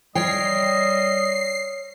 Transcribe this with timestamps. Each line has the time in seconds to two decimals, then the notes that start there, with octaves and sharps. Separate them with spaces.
0.15 G3 C#5 D#5 G5 C7